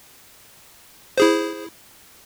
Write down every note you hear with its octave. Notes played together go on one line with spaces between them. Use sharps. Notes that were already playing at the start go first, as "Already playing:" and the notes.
E4 G#4 C5